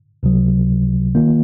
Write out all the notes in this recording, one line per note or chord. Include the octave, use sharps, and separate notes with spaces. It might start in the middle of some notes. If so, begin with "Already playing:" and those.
C#2 C3 F#3
D#3 A#3 F4